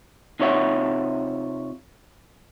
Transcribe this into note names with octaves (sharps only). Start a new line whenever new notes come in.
C3 D#4 F4 C#5 E5 F#5